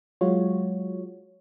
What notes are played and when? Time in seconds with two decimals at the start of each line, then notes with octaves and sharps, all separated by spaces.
0.21 F#3 G#3 F4 F#4 C#5